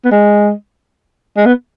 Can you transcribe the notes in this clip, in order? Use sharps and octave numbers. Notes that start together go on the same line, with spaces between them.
B3
G#3
G#3
B3